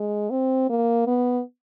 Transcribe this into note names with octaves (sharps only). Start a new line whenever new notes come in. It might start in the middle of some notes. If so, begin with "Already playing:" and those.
Already playing: G#3
C4
A#3
B3